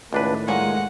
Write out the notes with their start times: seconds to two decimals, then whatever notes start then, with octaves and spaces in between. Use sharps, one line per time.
0.13 C#2 A2 D#3 A3 D4 B4
0.48 A#2 G#3 C#5 F#5